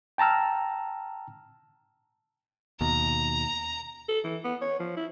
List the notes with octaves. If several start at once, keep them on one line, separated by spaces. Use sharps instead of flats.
G5 A5 A#5 E6 F6
D#2 B2 A#5
A4
E3
B3
C#5
F3
E4